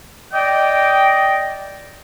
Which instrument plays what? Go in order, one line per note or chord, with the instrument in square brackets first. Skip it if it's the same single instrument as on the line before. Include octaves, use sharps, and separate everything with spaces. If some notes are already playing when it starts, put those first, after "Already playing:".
[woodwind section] D5 D#5 G5